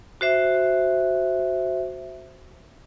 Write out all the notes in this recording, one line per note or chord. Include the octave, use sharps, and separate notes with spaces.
F#4 C5 E5